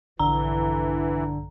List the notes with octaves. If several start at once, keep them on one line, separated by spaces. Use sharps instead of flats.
A#1 G2 D3 E3 A#5